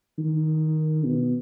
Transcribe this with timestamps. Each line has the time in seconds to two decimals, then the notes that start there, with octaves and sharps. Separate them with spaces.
0.18 D#3
1.04 B2